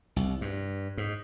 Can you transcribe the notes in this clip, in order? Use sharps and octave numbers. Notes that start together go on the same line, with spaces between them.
C2
G2
G#2